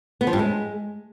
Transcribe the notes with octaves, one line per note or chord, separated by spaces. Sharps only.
B3
F3
G2
G#3